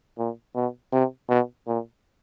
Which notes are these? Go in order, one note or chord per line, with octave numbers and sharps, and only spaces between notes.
A#2
B2
C3
B2
A#2